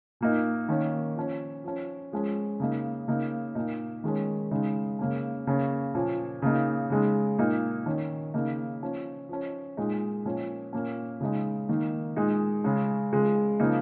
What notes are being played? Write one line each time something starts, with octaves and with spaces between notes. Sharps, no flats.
A#2 A#3 D#4
D#3 A#3 C#4
F3 C#4
F3 C#4
F3 G#3 C#4
C#3 A#3 D#4
C#3 A#3 D#4
A#2 A#3 D#4
D#3 G#3 C#4
C#3 G#3 D#4
C#3 A#3 C#4
C#3 A#3 C#4
A#2 F3 C#4
C#3 A#3 D#4
C#3 G#3 D#4
A#2 A#3 D#4
D#3 C#4
C#3 A#3 D#4
F3 C#4
F3 C#4
A#2 G#3 D#4
A#2 F3 C#4
A#2 A#3 C#4
C#3 G#3 D#4
D#3 A#3 D#4
A#2 G#3 D#4
C#3 G#3 C#4
C#3 F3 G#3
C#3 F3 A#3 D#4